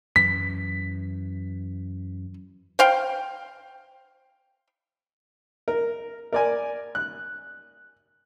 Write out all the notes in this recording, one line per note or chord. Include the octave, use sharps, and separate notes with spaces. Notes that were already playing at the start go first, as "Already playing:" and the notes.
F#2 E3 B6
C5 F5 G5
A#4
A#4 D5 G#5
F#6